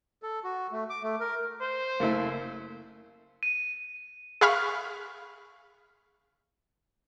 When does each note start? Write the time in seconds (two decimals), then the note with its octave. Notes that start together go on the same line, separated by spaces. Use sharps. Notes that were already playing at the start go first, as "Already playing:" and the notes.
0.23 A4
0.44 F#4
0.72 A3
0.90 D6
1.03 A3
1.20 A#4
1.62 C5
2.00 F#1 A3 A#3 E4
3.43 D#7
4.41 G#4 E5 F5 B5 C#6 F6